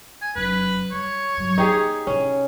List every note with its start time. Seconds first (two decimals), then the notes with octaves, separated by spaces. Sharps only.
0.22 G#5
0.35 F1 F#2 B4
0.92 G3 C#5
1.37 G2 F#3
1.58 A#3 D#4 G4 G#4
2.07 C3 C#4 E4